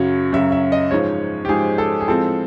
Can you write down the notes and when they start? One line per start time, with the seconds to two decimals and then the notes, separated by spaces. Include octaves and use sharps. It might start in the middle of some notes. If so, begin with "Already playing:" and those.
Already playing: F#2 C#3 F#3 C#5
0.33 F#2 C#3 F#3 E5
0.52 E5
0.72 D#5
0.91 G#2 F3 G#3 C#5
1.45 G4
1.49 G#2 F3 G#3 G#4
1.78 A4
2.01 G#4
2.07 A2 F3 G#3 C4 A4